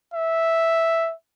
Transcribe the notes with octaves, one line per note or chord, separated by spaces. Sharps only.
E5